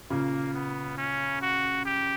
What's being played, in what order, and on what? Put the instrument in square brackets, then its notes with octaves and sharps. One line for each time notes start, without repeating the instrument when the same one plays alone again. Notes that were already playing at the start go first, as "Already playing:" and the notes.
[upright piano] A#2 C#3 [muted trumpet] A#3
[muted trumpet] B3
C#4
F#4
G4